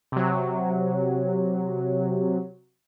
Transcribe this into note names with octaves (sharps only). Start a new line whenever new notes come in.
C3 F#3